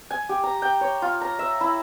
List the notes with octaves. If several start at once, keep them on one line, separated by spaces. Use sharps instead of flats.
G#5
G4
A#5
G5
C#5
F4
A#5
E5
E4